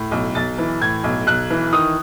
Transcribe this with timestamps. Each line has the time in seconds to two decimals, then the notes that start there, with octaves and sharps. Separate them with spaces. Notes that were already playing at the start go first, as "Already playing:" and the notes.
Already playing: A2
0.11 B1
0.35 B1 A6
0.58 E3
0.81 A2 G#6
1.04 B1
1.27 B1 F#6
1.50 E3
1.73 D#3 D#6